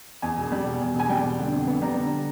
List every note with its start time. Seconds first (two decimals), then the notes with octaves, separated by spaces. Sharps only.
0.22 E2 G#5
0.38 E1
0.52 G3
0.66 B2
0.81 E2
0.95 E1 G#5
1.09 G3 G5
1.24 B2
1.39 D3
1.53 F2
1.67 B3
1.82 G3 A#5
1.97 D3